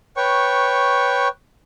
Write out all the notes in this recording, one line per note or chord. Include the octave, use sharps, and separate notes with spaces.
B4 C#5 G5 C#6